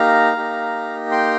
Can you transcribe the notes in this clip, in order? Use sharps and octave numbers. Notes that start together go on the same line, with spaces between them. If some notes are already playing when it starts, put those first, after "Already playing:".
Already playing: A#3 D#4 G4 F5 A#5
A#3 D#4 G4
G5 C6